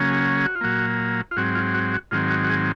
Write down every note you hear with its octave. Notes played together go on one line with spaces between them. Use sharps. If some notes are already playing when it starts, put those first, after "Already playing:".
Already playing: C#3 F#3 A#3 C#4
G#4
G#4
F#4
F4
A#2 F#3 A#3 F#4
F4
G#2 F#3 C4 F#4
F4
F#4
F#4
G#2 D#3 F#3 C4 F4
F#4
F#4
G#4